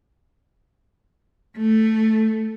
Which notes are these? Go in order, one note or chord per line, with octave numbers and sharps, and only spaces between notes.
A3